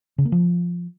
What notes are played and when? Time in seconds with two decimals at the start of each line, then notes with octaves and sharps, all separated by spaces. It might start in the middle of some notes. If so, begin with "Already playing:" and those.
0.18 C#3
0.25 A#3
0.32 F3